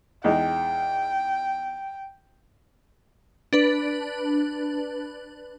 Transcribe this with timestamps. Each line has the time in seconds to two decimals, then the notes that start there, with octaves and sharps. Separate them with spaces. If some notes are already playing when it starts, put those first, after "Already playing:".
0.24 E2 G#3 D#4 G5
3.53 D4 B4